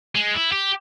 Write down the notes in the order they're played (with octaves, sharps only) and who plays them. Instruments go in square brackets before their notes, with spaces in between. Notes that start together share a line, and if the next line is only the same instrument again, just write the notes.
[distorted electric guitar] G#3
E4
G4